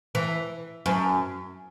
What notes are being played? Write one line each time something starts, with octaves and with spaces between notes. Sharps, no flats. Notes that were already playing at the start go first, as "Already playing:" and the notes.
E3
F#2